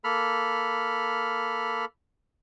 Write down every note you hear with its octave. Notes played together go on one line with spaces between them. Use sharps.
A#3 A4 B5 F6